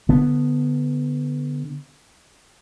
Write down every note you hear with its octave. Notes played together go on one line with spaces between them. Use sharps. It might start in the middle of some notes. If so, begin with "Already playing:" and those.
D3 B3